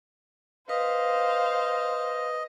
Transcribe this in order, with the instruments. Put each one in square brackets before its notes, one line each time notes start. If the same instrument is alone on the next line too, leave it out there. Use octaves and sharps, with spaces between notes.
[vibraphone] B4 [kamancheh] C5 F5 [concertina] D#5